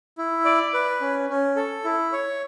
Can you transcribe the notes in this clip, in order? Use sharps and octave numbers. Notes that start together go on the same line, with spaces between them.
E4
D5
B4
C#4
C#4
A4
E4
C#5